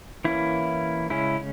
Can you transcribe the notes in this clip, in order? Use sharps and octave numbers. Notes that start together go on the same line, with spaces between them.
E3 A#3 C#4 E4
C#3 G#3 C#4 E4